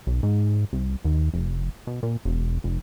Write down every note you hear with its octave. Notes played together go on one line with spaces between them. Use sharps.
B1
G#2
C2
D#2
F1
B2
A#2
E1
F1